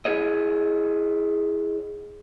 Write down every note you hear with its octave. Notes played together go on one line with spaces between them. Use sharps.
E4 G#4 C#5 D#5